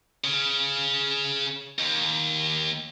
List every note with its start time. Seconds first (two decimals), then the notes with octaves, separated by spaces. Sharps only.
0.24 C#3
1.79 D#2